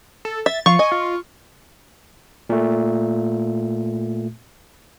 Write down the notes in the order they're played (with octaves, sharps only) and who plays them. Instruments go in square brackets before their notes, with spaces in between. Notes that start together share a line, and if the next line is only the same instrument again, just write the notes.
[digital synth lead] A4
[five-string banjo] E5 [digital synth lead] A6
[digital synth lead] F3 [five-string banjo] F4 F5 [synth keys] C#6
[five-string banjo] D#5 [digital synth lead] G#5
[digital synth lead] F4
[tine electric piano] A#2 A3